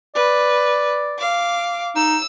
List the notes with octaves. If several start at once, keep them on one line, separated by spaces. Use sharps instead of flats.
B4 D5
F5 D6
D#4 E6